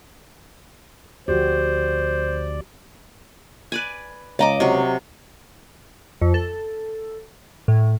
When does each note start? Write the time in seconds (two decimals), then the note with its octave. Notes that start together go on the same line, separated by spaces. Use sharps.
1.28 D2 F3 F#4 G4 C5 D5
3.72 B4 D5 G#5
4.39 C#2 D5 D#5 A#5 D6
4.60 C3 F#3
6.21 F2
6.34 A4
7.68 A2